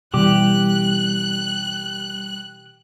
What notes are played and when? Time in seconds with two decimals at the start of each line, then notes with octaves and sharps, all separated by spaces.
0.14 B2 E3 G3 G4 D6 F#6